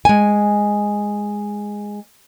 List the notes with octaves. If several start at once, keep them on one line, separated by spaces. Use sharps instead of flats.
G#3 G#5